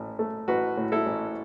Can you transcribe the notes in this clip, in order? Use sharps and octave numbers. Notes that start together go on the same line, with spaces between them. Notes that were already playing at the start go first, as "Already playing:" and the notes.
Already playing: A1 A2
A3
A1 F#4 B4
A2
E4 A4
A1